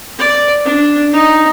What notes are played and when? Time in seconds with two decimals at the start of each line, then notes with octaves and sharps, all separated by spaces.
0.19 D5
0.65 D4
1.13 D#4